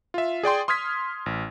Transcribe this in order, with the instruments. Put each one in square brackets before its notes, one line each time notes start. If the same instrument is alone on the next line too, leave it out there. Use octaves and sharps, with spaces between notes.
[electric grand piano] F4 E5
G#4 D5 G5 C6
C6 D#6 F6 G#6 B6
A1